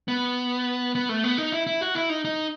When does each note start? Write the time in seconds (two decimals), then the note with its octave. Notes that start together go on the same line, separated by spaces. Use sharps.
0.08 B3
0.95 B3
1.09 A3
1.24 B3
1.38 D#4
1.52 E4
1.67 E4
1.81 F#4
1.95 E4
2.09 D#4
2.25 D#4